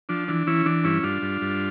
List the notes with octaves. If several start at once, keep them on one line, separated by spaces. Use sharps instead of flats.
F3 D4
E3 D4
E3 C#4 E4
E3 D4
G2 C#4 E4
G2 D4 F4
G2
G2